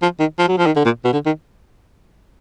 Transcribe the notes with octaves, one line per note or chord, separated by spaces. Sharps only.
F3
D#3
F3
F#3
F3
D#3
D3
A#2
B2
D3
D#3